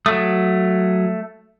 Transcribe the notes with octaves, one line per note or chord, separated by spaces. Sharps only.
F#3 A3 D#6